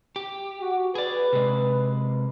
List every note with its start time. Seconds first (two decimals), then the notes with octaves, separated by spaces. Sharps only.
0.16 G4
0.61 F#4
0.95 G#4 B4 D5
1.33 C3 G#3